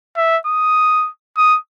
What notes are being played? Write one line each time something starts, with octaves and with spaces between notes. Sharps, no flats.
E5
D#6
D#6